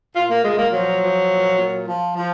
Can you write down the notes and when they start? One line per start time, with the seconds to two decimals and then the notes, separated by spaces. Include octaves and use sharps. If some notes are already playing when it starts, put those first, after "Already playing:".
0.16 A#2 F4
0.30 A#3
0.44 A#2 G#3
0.58 A#3
0.73 F3 F#3
1.02 F3
1.31 A#2
1.59 A#2
1.88 F3
2.17 F3